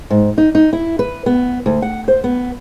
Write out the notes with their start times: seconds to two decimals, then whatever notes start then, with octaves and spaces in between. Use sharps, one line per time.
0.10 G#2
0.38 D#4
0.55 D#4
0.73 E4
0.99 B4
1.26 B3
1.66 D2
1.82 F#5
2.08 C5
2.24 B3